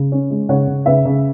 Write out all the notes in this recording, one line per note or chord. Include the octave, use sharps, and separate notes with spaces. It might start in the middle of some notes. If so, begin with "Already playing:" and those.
Already playing: C#3
C#4
G#3
C#3 C#5 F#5
C#3
C#3 B4 E5
C#3